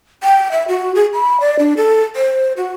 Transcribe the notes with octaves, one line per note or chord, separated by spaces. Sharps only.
G5
E5
F#4
G#4
B5
D5
D4
A4
C5
F#4